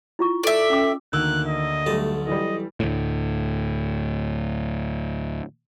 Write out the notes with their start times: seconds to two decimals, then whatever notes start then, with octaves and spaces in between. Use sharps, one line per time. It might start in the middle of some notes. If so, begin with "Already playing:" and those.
0.19 E4 F4 C#6
0.44 A4 D5 E5
0.70 C#4 G5 D6
1.13 D2 D3 D#3 A#3 E6 F#6
1.47 D#5
1.86 B1 G3 A3 A5
2.27 E3 G3 D#5
2.80 D2 A2